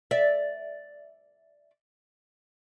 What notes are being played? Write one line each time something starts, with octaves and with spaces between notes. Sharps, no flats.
D5 E5